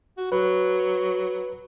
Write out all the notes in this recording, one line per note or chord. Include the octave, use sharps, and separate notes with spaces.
F#4
F#3 B4